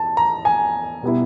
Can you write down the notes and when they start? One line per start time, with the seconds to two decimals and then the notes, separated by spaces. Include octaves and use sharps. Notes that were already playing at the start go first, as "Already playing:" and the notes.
Already playing: E2 A5
0.17 A#5
0.45 G#5
1.03 B2 G3 B3 E4